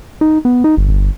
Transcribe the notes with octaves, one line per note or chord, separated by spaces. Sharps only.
D#4
B3
D#4
G1
G1